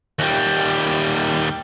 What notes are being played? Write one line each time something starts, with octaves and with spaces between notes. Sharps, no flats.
D#2 G3